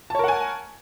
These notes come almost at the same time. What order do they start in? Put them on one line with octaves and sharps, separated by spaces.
A5 C#5 A#4 F#5 G#5